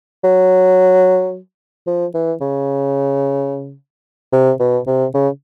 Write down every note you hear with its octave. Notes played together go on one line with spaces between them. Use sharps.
F#3
F3
E3
C#3
C3
B2
C3
C#3